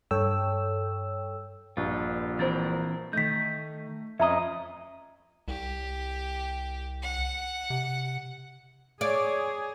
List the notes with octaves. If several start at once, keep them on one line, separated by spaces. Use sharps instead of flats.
G2 A4 C#5 G5 E6
A#1 G2 F4
E3 C4 A#4 C5 A6
D#3 A3 D#4 G6 B6
F2 C#4 D#5 E5 A#5 D#6
C2 G4
F#5
C3
G#4 C#5 D5